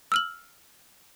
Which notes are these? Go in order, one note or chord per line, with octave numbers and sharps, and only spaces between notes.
E6 F6 F#7